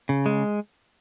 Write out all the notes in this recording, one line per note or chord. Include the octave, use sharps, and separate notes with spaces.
C#3
G#3